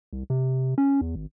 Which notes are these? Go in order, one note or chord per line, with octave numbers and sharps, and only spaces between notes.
C2
C3
C#4
E2
G#1